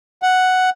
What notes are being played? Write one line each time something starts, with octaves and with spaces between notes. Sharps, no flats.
F#5